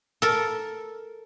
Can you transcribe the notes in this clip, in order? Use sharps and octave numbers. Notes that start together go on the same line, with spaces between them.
A4 A#4